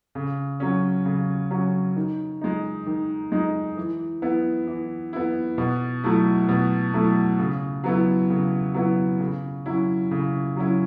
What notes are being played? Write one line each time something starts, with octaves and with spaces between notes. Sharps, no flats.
C#3
F#3 C#4
C#3
F#3 C#4
D#3
G#3 D#4
D#3
G#3 D#4
E3
B3 E4
E3
B3 E4
B2
F#3 A3 E4
B2
F#3 A3 E4
C#3
F#3 B3 E4
C#3
F#3 B3 E4
C#3
F#3 C#4 E4
C#3
F#3 C#4 E4